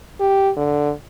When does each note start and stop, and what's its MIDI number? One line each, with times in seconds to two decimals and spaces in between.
0.20 0.50 67
0.57 0.91 50